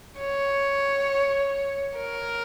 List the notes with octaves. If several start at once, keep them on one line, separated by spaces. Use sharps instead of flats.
C#5
A#4